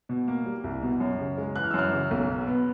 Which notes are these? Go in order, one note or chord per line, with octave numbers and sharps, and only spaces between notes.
B2
A#3
G3
C2
B2
F#2
C#3
G#3
E3 F#6
F6
E6
F#2 F6
C#3
B1
B2
B3